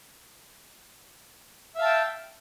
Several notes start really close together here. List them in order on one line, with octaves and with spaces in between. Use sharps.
E5 F5 A5 G5